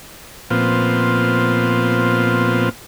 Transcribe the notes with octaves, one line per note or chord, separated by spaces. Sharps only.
A#2 F3 B3 C4 F4